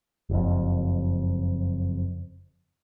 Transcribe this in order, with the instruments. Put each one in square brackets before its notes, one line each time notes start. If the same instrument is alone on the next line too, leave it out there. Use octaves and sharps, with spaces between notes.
[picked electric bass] F#1 F2